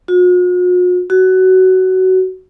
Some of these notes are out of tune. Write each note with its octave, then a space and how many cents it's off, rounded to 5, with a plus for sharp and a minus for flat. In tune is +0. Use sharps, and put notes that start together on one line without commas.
F#4 -45
F#4 +15